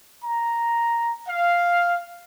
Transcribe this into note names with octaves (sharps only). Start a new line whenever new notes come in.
A#5
F5